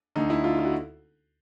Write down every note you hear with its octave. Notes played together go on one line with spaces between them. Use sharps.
D2 D3 D#4
E4
F4
F4
F#4